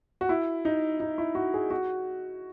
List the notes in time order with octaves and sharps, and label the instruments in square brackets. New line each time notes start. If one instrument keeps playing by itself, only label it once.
[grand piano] F#4
E4
D#4
D#4
E4
F#4
G#4
F#4